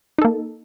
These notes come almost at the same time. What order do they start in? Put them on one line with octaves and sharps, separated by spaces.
D#4 A4 A#3